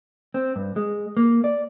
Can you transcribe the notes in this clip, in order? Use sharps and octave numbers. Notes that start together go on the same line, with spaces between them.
C4
G2
G#3
A#3
D5